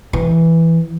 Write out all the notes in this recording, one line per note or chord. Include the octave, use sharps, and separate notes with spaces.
E3